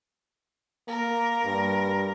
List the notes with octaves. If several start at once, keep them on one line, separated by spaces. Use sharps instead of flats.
A#3 A#4
G2